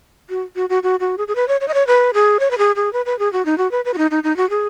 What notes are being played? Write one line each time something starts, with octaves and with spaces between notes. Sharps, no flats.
F#4
F#4
F#4
F#4
F#4
G#4
G#4
B4
C#5
C#5
D#5
C#5
B4
G#4
C#5
B4
G#4
G#4
B4
B4
G#4
F#4
D#4
F#4
B4
B4
F#4
D#4
D#4
D#4
F#4
G#4